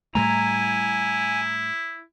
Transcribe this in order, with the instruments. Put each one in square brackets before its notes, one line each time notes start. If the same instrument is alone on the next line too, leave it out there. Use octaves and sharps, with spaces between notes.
[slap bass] A2 G3 A3 [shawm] E4 [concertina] G#5 [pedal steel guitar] A#5